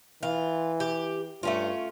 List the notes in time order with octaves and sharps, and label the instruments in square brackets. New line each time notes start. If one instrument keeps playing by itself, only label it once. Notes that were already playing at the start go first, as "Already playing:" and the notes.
[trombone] E3 [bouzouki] F4
[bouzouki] G4
[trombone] G2 [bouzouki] A3 C#4 F4